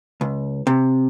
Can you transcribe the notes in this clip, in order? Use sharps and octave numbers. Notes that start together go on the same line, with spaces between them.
C#2
C3